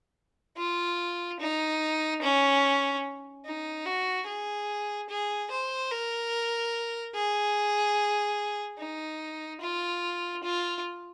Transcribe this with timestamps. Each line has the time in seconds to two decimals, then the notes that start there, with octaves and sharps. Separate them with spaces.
0.57 F4
1.39 D#4
2.22 C#4
3.45 D#4
3.85 F#4
4.26 G#4
5.09 G#4
5.50 C5
5.91 A#4
7.14 G#4
8.78 D#4
9.61 F4
10.43 F4